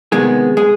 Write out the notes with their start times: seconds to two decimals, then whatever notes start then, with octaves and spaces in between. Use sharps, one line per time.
0.12 C3 D#3 G#3 B3 G#4
0.57 G#3 G#4